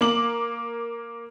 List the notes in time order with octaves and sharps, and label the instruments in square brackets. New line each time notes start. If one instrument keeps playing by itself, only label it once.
[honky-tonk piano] A#3 D6 F#7